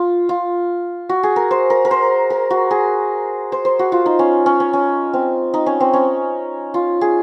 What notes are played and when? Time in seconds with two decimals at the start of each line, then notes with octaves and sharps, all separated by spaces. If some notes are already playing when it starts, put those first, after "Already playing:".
Already playing: F4
0.29 F4
1.09 F#4
1.23 G#4
1.36 A#4
1.51 C5
1.70 A#4
1.85 A#4
1.91 C5
2.30 A#4
2.50 F#4
2.71 G#4
3.52 C5
3.65 C5
3.79 F#4
3.92 F4
4.06 D#4
4.19 C#4
4.46 C#4
4.60 C#4
4.73 C#4
5.14 C4
5.54 D#4
5.66 C#4
5.80 C4
5.93 C#4
6.74 F4
7.01 G#4